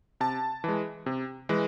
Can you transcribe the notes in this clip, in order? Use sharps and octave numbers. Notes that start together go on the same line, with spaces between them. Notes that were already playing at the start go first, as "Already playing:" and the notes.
C3 A5
E3 G#3
C3
E3 G#3